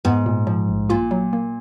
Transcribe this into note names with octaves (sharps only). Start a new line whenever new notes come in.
G#2 B3
A#2
F3
A#1
A#2 F4
F#3
A#3